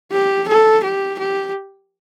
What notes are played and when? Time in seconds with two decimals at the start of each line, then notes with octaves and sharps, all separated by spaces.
0.12 G4
0.48 A4
0.84 G4
1.19 G4